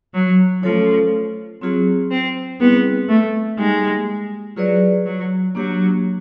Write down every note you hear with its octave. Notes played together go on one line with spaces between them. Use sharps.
F#3
F3 A3 C#4 F4 A4 C#5
F#3 C4 F4 G#4
C4
G3 B3 C4 E4 G#4
A3
G3 G#3 A#3 D#4 G4
F#3 F4 G#4 B4 D5
F#3
F#3 A#3 D4 G4